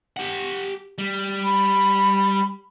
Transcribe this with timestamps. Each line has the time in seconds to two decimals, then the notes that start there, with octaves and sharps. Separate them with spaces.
0.17 G4 F#5
0.98 G3
1.44 B5